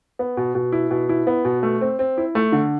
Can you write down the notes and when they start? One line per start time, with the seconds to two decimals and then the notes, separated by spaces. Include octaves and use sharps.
0.19 B3
0.37 B2
0.55 B2
0.72 E4
0.91 B2
1.09 E4
1.27 B3
1.45 B2
1.63 A3
1.81 C4
1.99 C4
2.18 E4
2.35 A3
2.52 D3